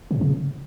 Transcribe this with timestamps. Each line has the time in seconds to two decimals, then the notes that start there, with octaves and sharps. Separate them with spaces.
0.11 C3
0.16 G2
0.21 C#3